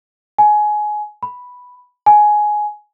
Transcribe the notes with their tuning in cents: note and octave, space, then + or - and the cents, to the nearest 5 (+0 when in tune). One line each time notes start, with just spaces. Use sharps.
G#5 +20
B5 +0
G#5 +10